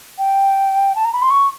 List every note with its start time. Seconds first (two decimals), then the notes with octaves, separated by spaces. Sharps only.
0.18 G5
0.96 A5
1.05 A#5
1.13 B5
1.22 C6
1.31 C#6